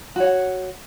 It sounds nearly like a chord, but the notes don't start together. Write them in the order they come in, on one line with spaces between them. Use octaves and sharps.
F#4 C#5 F#5